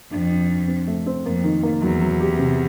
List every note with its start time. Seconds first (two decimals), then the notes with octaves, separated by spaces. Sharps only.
0.11 F2 D4
0.30 D4
0.49 D4
0.68 C4
0.87 A3
1.06 C4
1.25 F2 A#3
1.44 D#3
1.63 A#3
1.82 E2 F#3
2.01 F#3
2.20 G4
2.39 C3